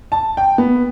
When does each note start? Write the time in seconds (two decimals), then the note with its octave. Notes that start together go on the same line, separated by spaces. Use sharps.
0.12 A5
0.37 G5
0.58 B3